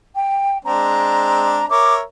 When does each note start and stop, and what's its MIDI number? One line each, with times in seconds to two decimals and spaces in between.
0.15 0.58 79
0.65 1.65 56
0.65 1.65 60
0.65 1.65 62
0.65 1.65 82
1.70 2.02 70
1.70 2.02 73
1.70 2.02 76
1.70 1.94 86